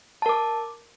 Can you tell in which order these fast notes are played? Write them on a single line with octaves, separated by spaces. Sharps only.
A5 A#4 D6